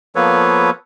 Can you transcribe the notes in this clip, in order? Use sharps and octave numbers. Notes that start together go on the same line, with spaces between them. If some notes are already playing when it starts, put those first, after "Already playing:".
F3 A#3 B3 A4 B4 C#5